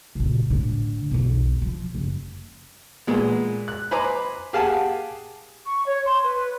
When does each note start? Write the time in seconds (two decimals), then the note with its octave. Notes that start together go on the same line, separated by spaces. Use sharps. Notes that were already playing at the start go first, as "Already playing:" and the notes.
0.15 C#2 A#2
0.50 A2 D3
1.11 B1 E2
1.62 F3
1.95 F#1
3.07 A#2 G#3 B3
3.68 F#6
3.91 B4 C5 G#5 A#5 B5 D6
4.53 G4 G#4 F5 F#5 G#5 A5
5.66 C#6
5.86 C#5
6.06 C6
6.24 B4